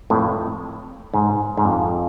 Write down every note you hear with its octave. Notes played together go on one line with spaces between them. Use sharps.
F2 A2
G#2
G#2
F2